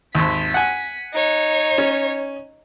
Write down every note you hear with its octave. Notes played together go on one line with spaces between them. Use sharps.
G#1 D#2 B6
F#5 G#5
D#4 C#5
C#4